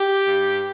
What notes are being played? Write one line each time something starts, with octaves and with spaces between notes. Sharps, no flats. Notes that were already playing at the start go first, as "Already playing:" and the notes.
Already playing: G4
G2